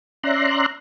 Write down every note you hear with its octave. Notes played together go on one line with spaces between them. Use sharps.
C#4 D5 E5 A#5 C6 F#6